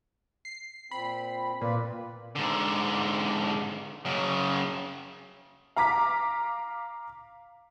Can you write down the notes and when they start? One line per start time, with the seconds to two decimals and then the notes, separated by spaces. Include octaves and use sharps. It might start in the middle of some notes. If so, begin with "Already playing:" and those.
0.45 C7
0.91 A#2 C4 B5
1.61 A#2 F4 B4 D5
2.35 G#2 D3
4.05 F#2 C#3
5.76 F5 A#5 D6 B6